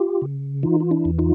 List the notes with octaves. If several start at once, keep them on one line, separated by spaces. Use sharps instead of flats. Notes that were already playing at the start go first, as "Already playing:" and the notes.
Already playing: F4 G4
C#3
E3 D#4 F4
F4
D4 E4
E2
D#4 F4